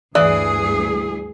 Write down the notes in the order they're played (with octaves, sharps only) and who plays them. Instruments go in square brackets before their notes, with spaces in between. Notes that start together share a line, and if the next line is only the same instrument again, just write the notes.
[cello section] D2 G2 G#4 [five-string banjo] E3 [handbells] D5 [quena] D#6